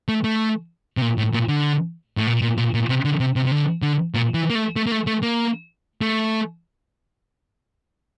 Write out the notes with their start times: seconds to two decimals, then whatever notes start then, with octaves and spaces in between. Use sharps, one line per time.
0.08 A3
0.24 A3
0.97 C3
1.02 A#2
1.18 A2
1.33 A#2
1.48 D3
2.17 A2
2.27 A#2
2.42 A#2
2.58 A#2
2.74 A#2
2.89 C3
3.05 D3
3.20 C3
3.36 C3
3.46 C3
3.52 D3
3.82 D3
4.14 A#2
4.34 E3
4.50 A#3
4.55 A3
4.76 A3
4.87 A#3
4.92 A3
5.07 A3
5.23 A#3
6.01 A3